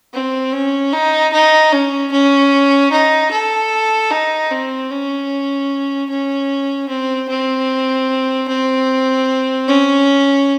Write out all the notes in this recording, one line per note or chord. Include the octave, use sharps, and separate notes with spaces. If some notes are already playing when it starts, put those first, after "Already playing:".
C4
C#4
D#4
D#4
C#4
C#4
D#4
A4
D#4
C4
C#4
C#4
C4
C4
C4
C#4